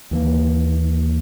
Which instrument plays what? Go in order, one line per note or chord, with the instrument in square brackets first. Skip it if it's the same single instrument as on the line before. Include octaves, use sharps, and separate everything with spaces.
[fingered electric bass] D#2 E3 A#3